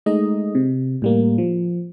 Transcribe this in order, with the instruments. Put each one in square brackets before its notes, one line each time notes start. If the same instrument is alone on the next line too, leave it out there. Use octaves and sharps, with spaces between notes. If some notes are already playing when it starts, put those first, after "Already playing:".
[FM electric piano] G#3 A3 D#4 D#5
C3
A2 G3 A#3
F3